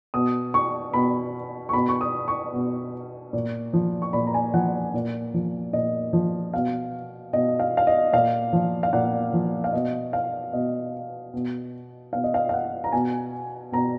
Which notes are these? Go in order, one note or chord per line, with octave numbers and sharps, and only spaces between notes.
B2 D#6
C#6
B2 B5
C#6
B2 B5
C#6
D#6
C#6
B2
A#2
F3
C#6
A#2 B5
A#5
G#5
F3 F#5
A#2
F3
A#2 D#5
F3
B2 F5
B2 D#5
F5
F5
D#5
A#2 F5
F3
F5
A#2 F#5
F3
F5
B2 D#5
F5
B2 D#5
B2
B2 F5
D#5
F5
F5
F#5
A#5
B2 G#5
B2 A#5